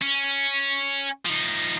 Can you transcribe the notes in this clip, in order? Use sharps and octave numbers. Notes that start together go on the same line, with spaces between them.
C#4
F3 D#4